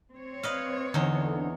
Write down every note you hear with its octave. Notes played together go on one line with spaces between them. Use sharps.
C4 C#5
B4 D#5 F5
E2 D3 D#4